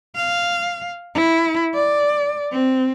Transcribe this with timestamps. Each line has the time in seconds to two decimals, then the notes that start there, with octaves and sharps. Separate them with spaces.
0.16 F5
1.15 E4
1.74 D5
2.52 C4